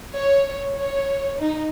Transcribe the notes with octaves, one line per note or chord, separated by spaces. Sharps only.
C#5
C#5
D#4